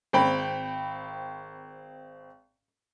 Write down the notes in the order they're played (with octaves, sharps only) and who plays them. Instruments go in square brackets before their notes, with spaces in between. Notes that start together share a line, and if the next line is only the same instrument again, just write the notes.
[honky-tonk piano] G#1 C4 G5 B5